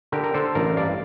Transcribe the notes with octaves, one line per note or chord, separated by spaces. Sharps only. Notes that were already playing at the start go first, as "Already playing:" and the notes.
D3 G4 A#4
A#4
D3 A4 C5
A1 A#4 D5
G2 D5 F5